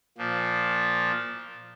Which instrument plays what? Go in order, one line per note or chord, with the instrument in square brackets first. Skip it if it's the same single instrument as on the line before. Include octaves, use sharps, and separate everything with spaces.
[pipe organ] A#2 F3